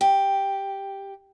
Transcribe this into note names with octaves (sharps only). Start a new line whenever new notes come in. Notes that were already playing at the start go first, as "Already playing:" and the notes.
G4